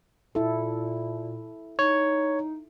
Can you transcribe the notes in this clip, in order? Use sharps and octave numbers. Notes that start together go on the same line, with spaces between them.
A#2 E4 A4
D#4 C#5